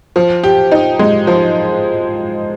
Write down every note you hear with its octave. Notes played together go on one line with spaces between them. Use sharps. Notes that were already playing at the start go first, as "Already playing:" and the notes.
F3
G4
D#4
G#3
F3